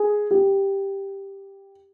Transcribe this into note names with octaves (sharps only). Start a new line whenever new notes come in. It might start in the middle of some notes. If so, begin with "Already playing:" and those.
Already playing: G#4
G4